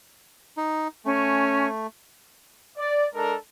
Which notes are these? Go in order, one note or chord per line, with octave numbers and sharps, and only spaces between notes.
D#4
A3 C#4 G#5
D5
G#3 D4 A4 A#4